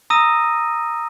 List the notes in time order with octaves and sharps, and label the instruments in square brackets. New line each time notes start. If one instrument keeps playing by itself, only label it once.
[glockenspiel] A#5 D#6 E6 A#6 D#7